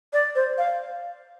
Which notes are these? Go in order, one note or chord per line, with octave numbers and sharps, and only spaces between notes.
D5
C5
F5